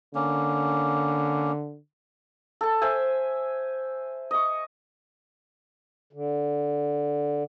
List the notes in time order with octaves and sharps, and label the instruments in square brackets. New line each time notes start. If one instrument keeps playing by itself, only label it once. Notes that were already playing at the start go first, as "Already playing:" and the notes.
[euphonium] D3 [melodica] A#3 C#4
[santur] A4 A5
C5 E5 G#5
D#5 C#6
[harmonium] D3